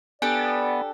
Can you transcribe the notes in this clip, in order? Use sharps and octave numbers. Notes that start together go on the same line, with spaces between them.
B3 D4 G4 A4 D5 G#5